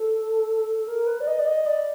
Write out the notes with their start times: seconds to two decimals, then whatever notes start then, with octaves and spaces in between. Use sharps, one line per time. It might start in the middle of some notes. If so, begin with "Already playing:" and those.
Already playing: A4
0.87 A#4
1.07 B4
1.20 D5
1.27 D#5
1.39 D5
1.47 D#5
1.66 D5